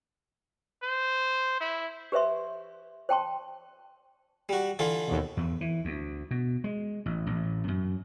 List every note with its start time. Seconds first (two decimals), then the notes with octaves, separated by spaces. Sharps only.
0.83 C5
1.61 E4
2.12 G4 B4 C5 E5 C6
3.09 C5 G5 A5 C6
4.49 G3 F#4
4.79 D3 E3 F4
5.07 D#2 B2
5.37 E2
5.61 E3
5.85 D2
6.31 B2
6.64 G#3
7.06 A1
7.27 A1
7.68 F#2